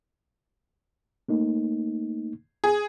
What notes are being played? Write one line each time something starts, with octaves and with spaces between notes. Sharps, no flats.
A3 A#3 D#4
G#4